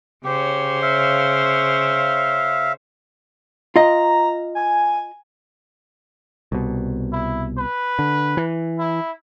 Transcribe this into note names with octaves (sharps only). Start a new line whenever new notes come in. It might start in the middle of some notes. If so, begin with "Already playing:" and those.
C#3 G4 C5 C#5
E5 F5
F4 D#5 A#5
G#5
C2 B2
E4
B4
D3
E3
E4